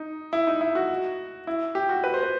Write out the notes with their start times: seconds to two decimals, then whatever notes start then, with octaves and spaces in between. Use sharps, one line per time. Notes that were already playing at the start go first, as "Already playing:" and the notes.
Already playing: D#4
0.33 E4
0.47 D#4
0.61 E4
0.75 F#4
1.47 E4
1.75 G4
1.89 F#4
2.04 B4
2.14 C5
2.23 B4